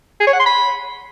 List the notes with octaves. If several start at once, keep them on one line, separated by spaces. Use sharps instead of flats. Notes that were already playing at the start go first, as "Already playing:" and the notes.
G#4
C#5
F#5
C6
B5